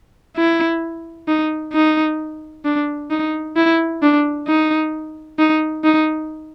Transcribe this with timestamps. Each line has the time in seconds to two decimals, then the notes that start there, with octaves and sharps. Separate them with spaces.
0.36 E4
1.28 D#4
1.73 D#4
2.65 D4
3.11 D#4
3.56 E4
4.02 D4
4.47 D#4
5.39 D#4
5.84 D#4